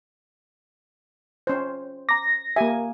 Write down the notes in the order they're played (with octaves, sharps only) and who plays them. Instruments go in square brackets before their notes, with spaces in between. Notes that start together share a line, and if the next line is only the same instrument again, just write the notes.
[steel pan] C#4 C5
[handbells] A#5 D6 [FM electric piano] A#6
[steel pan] A#3 G#5 [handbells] G4 E5